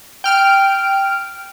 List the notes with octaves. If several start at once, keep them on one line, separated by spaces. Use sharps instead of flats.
G5 F6 D7